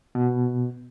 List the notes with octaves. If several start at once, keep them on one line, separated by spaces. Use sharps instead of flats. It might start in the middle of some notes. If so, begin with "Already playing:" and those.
B2